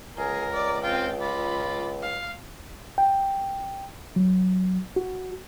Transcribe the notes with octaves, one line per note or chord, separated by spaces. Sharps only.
C#2 G#4 A#4
D5
C4 F4 F5 G5
F4 B5 D6
F5
G5
F#3
F#4